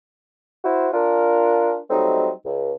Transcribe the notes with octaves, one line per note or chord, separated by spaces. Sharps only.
E4 F#4 C5
D4 F4 A#4
F#3 G3 A3 C4 D#4
C#2